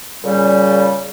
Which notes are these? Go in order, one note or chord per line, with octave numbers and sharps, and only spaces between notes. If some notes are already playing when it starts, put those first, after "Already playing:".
A#2 C#3 G3